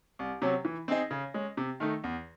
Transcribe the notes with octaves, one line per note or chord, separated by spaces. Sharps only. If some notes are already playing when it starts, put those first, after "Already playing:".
C2
C3 F#3 C#4
E3
C4 D#4 G#4 D#5
C#3
G#3 C#4
C3
D#3 A3 D#4
E2